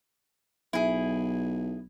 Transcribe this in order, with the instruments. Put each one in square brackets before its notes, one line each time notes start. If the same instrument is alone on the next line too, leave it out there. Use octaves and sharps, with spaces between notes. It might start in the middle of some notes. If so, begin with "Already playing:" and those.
[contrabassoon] B1 [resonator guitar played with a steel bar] E4 G#4